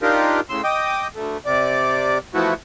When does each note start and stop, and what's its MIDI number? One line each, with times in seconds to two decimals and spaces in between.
0.01 0.40 62
0.01 0.40 63
0.01 0.40 65
0.01 0.40 67
0.01 0.40 70
0.49 0.62 45
0.49 0.62 49
0.49 0.62 84
0.49 0.62 88
0.64 1.07 75
0.64 1.07 79
0.64 1.07 86
0.64 1.07 87
1.15 1.37 38
1.15 1.37 57
1.45 2.18 48
1.45 2.18 74
2.34 2.54 52
2.34 2.54 53
2.34 2.54 57
2.34 2.54 59
2.34 2.54 64
2.34 2.54 66